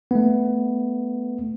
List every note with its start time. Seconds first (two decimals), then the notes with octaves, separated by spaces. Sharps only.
0.11 A3 B3